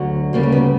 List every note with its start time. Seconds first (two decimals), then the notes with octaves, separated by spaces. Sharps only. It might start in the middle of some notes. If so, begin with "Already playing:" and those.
Already playing: D2 D3 F#3
0.33 D2 C#3 G3 A#3
0.43 A#3
0.52 B3